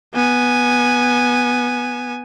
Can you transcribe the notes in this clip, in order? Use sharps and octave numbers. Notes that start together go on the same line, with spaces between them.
B3 G#5